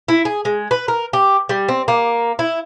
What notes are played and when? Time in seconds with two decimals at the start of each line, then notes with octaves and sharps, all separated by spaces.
0.08 E4
0.25 G#4
0.45 G#3
0.71 B4
0.88 A#4
1.13 G4
1.49 G3
1.68 C4
1.88 A#3
2.39 E4